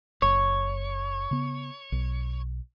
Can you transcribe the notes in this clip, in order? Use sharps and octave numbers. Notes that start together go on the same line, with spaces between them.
F#1 C#5
C#3 B3
B1